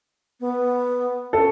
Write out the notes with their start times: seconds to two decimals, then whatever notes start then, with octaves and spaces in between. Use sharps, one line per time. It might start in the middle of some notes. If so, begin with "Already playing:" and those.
0.40 B3
1.33 C#4 A4